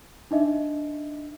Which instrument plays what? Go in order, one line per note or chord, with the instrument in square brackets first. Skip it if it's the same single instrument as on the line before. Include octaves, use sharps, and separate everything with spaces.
[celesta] D4 D#4 D#5 E5